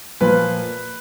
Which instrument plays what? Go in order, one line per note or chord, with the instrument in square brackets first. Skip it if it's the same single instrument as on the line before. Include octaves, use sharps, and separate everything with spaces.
[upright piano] A#2 F3 B4